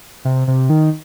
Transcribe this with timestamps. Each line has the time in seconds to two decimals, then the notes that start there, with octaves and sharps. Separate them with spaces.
0.25 C3
0.47 C3
0.70 D#3